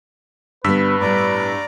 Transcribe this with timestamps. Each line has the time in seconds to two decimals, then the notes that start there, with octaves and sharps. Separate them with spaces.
0.64 G2 D3 G3 B3 B4 E6 B6
1.01 A2 G3 D5 A#5 D6